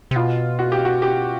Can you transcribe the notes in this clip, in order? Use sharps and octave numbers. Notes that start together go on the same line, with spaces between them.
C3
B2 F4
F#4
G4
F#4
G4